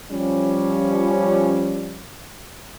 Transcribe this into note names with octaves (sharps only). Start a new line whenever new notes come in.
F3 G3 C#4